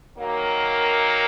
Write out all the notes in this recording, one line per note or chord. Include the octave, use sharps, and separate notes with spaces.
D#3 F#3 A#3